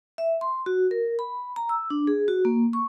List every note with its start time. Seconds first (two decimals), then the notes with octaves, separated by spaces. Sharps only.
0.18 E5
0.41 C6
0.66 F#4
0.91 A#4
1.19 B5
1.56 A#5
1.69 E6
1.90 D4
2.07 G#4
2.28 F#4
2.45 A#3
2.73 C#6